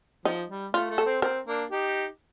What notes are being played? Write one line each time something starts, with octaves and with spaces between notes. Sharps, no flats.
F3 D#4
G3
A3 F4
A3
A4
C4
C4 A#4
A#3 D4
D#4 G4